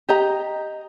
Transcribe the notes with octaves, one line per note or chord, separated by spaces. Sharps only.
G4 D#5 A#5